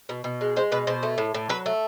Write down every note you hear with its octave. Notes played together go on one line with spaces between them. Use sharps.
B2
B2
G#3
G#3 C5
B2 B4
B2 C5
A3
A2
A2
F#3 B4
A3